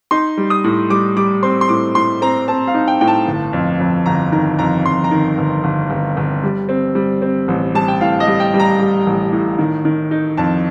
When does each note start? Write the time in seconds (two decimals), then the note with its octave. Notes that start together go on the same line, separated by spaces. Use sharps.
0.11 D#4 C6
0.37 G3
0.50 D#6
0.64 A2
0.90 G3 D6
1.16 G3 D6
1.43 C4 C6
1.61 C6
1.69 A2 D6
1.95 A2 C6
2.22 C4 A#5
2.48 C4 A5
2.67 F5
2.74 D#4
2.88 G5
3.01 A2 G5
3.08 A5
3.28 G1
3.53 F2
3.80 F2
4.06 G1 A#5
4.32 D#3 A#5
4.58 F2 A#5
4.85 F2 C6
5.04 A#5
5.11 D#3
5.38 G1
5.64 G1
5.90 G1
6.17 G1
6.43 G3
6.69 C4
6.95 G3
7.22 C4
7.48 A1
7.74 G3 A5
7.88 G5
8.01 A2 F5
8.20 D#5
8.27 G3
8.40 G5
8.54 G3
8.60 A#5
8.79 G3
9.07 A1
9.32 A2
9.58 D#3
9.85 D#3
10.11 D#4
10.37 F2 A5